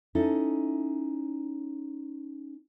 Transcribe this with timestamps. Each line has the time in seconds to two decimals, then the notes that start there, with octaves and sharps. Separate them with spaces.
0.15 C#4 D#4 E4 A4 D#5 A5